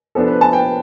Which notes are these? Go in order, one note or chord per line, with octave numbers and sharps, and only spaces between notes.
F3 B3 D4 A4
B4
A5
G5